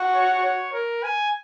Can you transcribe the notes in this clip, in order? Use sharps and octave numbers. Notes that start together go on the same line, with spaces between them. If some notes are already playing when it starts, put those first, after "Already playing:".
Already playing: F#4
C#5
C#5
A#4
G#5